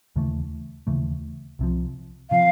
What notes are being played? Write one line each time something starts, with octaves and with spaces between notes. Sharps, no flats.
D#2 C#3 E3 A3
D#2 C#3 E3 A3
C2 C3 F3
C3 F3 F5